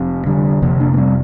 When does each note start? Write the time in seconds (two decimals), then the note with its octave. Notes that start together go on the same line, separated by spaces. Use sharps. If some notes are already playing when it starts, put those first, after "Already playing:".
Already playing: F1 F2 C3
0.26 D3 G3
0.62 F1 F2 C3 F3 A#3
0.80 A#3 D4
0.93 A#3
0.97 G3 C4